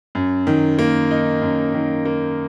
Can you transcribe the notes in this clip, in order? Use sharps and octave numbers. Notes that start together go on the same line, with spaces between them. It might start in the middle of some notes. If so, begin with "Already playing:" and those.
F#2
D#3
A#3
D#4
F#2
D#3
A#3